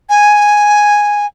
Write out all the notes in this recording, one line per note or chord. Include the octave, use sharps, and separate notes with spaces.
G#5